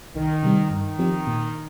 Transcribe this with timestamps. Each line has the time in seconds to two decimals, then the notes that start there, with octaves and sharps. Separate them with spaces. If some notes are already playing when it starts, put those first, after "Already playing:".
0.15 C2 D#3
0.43 C3 G3 C4
0.70 G2 D#3
0.99 F3 C4 G4
1.27 A#2